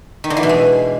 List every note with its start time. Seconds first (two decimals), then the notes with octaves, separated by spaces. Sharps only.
0.24 D#3
0.30 D3
0.37 E3
0.43 B2
0.49 G#3